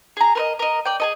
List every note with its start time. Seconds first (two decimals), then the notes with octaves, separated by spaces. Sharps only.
0.17 G#4 A#5
0.35 A#4 B4 D#5
0.59 A#4 D#5
0.85 D5 G5
1.00 G#4 A4 D#5